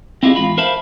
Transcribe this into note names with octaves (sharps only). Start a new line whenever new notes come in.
C4 E4 F4 G4 G#4 D#5
E2 G#2 F4 B5
A#4 C5 E5 F5 A5 B5